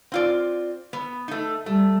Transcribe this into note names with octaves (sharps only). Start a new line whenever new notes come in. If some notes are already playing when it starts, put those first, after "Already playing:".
C4 F4 D5
B3
A3 D#4
G3 A3